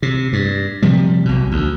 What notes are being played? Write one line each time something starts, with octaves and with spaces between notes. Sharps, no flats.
C3
G2
C3 F3 G3
B1 B2
D2